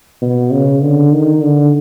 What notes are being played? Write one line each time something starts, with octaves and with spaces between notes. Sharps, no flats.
B2
C#3
D3
D#3
D3